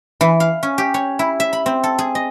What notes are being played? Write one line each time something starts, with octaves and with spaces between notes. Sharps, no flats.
E3
F5
C#4
G4
C#5
E4
E5
B5
C4
A4
G#4
D#5